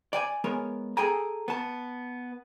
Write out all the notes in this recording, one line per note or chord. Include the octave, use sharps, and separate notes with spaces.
D5 G5 G#5
G#3 B3 A#4 C#5
G#4 A4 G5 G#5 A#5
B3 A5